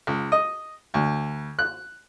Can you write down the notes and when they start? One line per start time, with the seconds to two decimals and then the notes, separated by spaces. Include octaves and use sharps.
0.07 C#2
0.32 D#5
0.94 D2
1.59 F#6